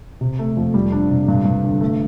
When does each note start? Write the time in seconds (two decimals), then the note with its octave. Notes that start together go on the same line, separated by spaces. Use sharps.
0.21 C3
0.39 A3
0.57 F2
0.74 G3
0.92 D4
1.10 C3
1.28 G2
1.45 G2
1.63 D3
1.81 A3